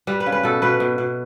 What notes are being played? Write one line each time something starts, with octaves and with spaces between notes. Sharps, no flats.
G3 B4
B4
C#3
B4
B2 A4
B2 B4
B2
B2